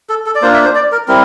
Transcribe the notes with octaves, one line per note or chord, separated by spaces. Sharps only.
A4
A4
D5
A#3 D4 F4 C5
E5
C5
D5
A#4
G3 C4 E4 A#4